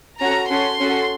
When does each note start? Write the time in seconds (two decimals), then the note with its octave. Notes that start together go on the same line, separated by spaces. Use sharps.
0.20 C#4 F#4 A4 A#5
0.50 C#4 F#4 A4 C6
0.80 C#4 F#4 A4